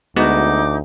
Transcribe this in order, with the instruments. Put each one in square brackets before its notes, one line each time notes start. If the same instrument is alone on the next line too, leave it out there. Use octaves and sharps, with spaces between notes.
[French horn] D2 [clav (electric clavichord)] G#3 B3 F#4 [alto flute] D#4 [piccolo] D6